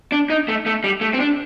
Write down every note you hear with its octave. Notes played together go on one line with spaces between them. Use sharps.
D4
D#4
A3
A3
G3
A3
C4
D4